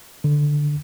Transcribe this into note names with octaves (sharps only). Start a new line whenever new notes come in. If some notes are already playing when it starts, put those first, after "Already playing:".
D3